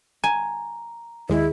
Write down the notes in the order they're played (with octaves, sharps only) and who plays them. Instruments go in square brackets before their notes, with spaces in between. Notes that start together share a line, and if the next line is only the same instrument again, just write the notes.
[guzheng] G#5 [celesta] A#5
[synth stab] D#2 G#3 [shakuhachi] E4